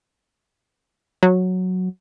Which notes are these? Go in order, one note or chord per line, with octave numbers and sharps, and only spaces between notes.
F#3